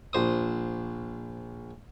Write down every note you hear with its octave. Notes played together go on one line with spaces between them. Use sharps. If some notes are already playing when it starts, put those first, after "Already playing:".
A#1 C5 D#6